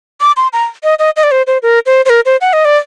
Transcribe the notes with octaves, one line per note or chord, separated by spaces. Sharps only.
D6
C6
A#5
D#5
D#5
D#5
D5
C5
C5
A#4
C5
C5
A#4
C5
F#5
D#5
D5